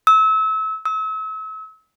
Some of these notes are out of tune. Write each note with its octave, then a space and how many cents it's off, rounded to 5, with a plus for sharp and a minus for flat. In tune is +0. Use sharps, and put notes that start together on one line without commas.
E6 -30
E6 -40